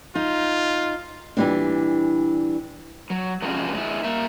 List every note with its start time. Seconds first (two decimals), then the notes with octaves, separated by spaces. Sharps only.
0.15 D#4 F4
1.37 A#2 E3 G3 A#3 C4 D4
3.10 F#3
3.42 C3 F3 G#3 C#4 F4 F#4
3.73 G#3 E4
4.04 A#3 E5